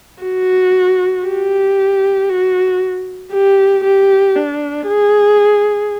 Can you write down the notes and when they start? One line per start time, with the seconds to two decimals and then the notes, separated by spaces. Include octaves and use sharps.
0.23 F#4
1.25 G4
2.29 F#4
3.32 G4
3.84 G4
4.36 D4
4.87 G#4